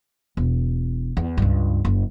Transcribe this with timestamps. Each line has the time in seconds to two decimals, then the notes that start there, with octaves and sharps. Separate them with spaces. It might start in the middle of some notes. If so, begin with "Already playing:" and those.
0.37 E1
1.17 E2
1.37 C#2 G2
1.85 F#1